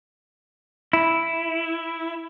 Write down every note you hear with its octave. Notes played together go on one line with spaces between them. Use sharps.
E4